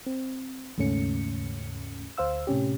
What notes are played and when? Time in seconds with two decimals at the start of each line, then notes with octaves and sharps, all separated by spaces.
0.06 C4
0.78 D#2 G#2 C#3 A3 C#4 C#7
2.17 D2 C5 F5 E6
2.47 A2 C3 C#4 G4